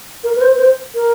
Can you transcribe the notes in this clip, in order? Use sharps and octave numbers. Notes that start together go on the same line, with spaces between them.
A#4
B4
C5
B4
C5
A#4